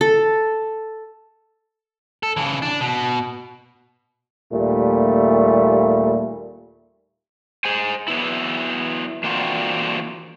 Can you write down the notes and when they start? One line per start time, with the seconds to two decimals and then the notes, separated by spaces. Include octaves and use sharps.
0.01 A4
2.23 A4
2.37 C#3 E3
2.62 D4
2.81 B2
4.53 D#2 A#2 G3 A3
7.65 G#4 C5 G#5
8.08 F#3 B3 E4
9.24 E3 A#3 C4 D4 F4 F#4